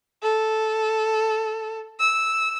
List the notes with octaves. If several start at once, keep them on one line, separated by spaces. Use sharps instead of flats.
A4
E6